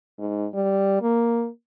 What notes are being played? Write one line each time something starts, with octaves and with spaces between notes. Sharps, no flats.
G#2
G3
A#3